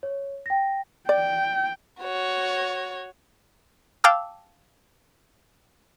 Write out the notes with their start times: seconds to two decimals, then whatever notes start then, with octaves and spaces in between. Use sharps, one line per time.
0.03 C#5
0.46 G5 A#6
1.09 D5 G5
2.01 F#4 C#5
4.04 F5 G5 A5 D6 E6